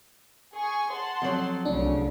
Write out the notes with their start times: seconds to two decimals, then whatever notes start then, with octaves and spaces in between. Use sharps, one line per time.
0.55 G#4 G#5 C#6
0.91 F#5 A5 C6
1.22 F2 F#3
1.65 C2 C#3 A3 D4